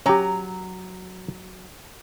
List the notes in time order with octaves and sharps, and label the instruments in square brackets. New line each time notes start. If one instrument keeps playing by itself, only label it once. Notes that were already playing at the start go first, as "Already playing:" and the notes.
[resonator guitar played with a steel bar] F#3 A#5 [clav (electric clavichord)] C#4 G4